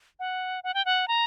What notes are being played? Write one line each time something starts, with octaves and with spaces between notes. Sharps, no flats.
F#5
F#5
G5
F#5
A#5